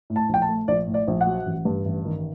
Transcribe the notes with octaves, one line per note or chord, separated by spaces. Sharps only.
A2
A5
A#1 G5
A5
A3
A#1 D5
A2
D5
A#1
F#5
F#3
A1
G2
A1
D#3